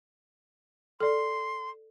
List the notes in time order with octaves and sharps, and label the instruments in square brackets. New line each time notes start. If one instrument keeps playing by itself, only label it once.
[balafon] A4 D5 [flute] C6